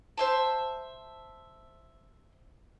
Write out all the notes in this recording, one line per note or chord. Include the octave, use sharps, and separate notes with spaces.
C5 E5 A5